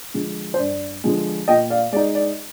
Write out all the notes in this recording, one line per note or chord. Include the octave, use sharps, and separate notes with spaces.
D3 F3 G#3
C5
G2 D5
D3 F3 G#3
A#2 D#5 G5
D5 F5
G#3 D#4 D5
D5